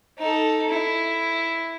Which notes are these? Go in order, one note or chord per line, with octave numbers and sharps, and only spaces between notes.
D#4 A4
E4